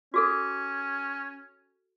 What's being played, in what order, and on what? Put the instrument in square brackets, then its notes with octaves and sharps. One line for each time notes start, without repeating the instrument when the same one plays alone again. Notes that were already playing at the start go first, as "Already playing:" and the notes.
[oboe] C#4 [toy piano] F#4 G#4 A4